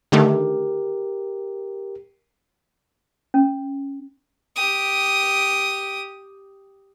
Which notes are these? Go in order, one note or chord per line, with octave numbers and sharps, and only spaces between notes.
D3 D#3 A3 G4 A#4
C#4
G4 D#6